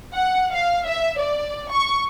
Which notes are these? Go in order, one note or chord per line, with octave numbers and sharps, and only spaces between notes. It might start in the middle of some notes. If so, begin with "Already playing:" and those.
F#5
F5
E5
D5
C#6